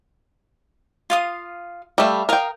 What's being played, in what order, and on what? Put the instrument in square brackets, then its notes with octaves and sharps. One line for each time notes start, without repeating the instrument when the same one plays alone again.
[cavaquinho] F4 F5 D#6
[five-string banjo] G3 A3 [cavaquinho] E5 F5
[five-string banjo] A#4 G5 [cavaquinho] F5 D#6